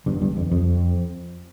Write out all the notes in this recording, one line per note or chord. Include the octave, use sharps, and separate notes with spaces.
G1 G2
G1 G2
F2
F2